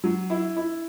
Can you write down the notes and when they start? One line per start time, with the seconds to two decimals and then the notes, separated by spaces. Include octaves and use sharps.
0.04 F#3
0.30 E4
0.57 E4